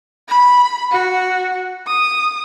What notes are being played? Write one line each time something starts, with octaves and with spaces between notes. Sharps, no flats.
B5
F#4
D#6